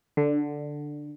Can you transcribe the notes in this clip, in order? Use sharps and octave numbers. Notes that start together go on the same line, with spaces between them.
D3